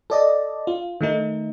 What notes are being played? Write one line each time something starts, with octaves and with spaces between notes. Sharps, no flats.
A4 D5 D#5
F4
D#3 A3 D#4